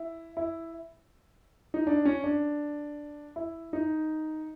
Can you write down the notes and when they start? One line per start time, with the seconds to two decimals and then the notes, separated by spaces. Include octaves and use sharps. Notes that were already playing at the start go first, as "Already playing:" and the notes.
Already playing: E4
0.37 E4
1.74 D#4
1.87 D4
2.05 C#4
2.24 D4
3.36 E4
3.73 D#4